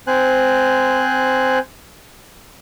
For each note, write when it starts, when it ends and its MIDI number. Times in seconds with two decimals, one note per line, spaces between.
0.07 1.59 60
0.07 1.59 72
0.07 1.59 80
0.07 1.59 90